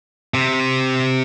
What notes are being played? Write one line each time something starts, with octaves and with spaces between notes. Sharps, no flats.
C3